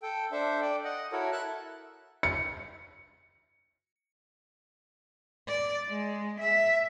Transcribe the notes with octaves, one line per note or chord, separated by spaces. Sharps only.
A4 G5
D4 A4 C5 E5
D5 G5
D#5 F#5
E4 F#4 A4 A#4 C#5
E5 A5 F#6
C#7
D5
G#3
E5